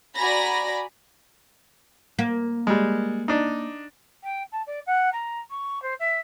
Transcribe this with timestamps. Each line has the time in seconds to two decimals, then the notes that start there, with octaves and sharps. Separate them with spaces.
0.16 F#4 D5 G#5 A#5 B5 A#6
2.19 A#3
2.67 G3 G#3
3.28 D4 D#4
4.23 G5
4.52 A5
4.67 D5
4.86 F#5
5.12 A#5
5.50 C#6
5.82 C5
5.99 E5